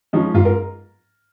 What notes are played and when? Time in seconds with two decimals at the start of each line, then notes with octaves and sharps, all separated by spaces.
0.13 F3 G#3 C#4 D#4
0.34 G#2 F4
0.45 A#4